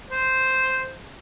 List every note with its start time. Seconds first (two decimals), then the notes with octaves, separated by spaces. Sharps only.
0.11 C5